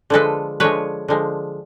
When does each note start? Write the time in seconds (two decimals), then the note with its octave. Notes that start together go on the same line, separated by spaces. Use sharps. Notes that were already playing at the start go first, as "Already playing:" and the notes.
0.10 D3 F3 G#3 A4 B4
0.60 D3 F3 G#3 B4 C#5
1.08 D3 F3 G#3